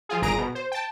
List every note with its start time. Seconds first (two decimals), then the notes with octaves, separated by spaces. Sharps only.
0.09 F3 F4 G#4
0.22 G1 A#2 G#4 A#5 A#6 D7
0.38 B2
0.55 C5
0.72 G5 A5